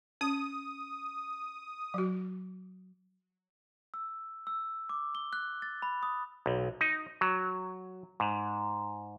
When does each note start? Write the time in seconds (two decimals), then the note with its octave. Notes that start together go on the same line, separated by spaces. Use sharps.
0.21 C#4 D#6
1.94 F#3 F#4
3.94 E6
4.47 E6
4.89 D6
5.15 G7
5.33 F#6
5.62 A6
5.82 B5
6.03 D#6
6.46 B1
6.81 D#4
7.21 F#3
8.20 G#2